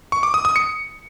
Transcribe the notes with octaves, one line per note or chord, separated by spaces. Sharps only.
C#6
D6
D#6
D#6
C#7